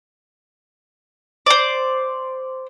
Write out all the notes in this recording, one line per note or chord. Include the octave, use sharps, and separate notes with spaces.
C5 D5